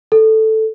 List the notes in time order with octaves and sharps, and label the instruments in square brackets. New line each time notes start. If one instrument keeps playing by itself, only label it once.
[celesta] A4